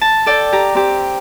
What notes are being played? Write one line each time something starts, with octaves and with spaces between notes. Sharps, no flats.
A5
A4 D5 G5
G4 A#5
C4 G4